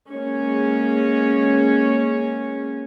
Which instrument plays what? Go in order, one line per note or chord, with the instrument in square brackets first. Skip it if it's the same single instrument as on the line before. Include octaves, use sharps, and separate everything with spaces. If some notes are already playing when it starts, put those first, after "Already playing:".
[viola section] G#3 A#3 C#4 C#5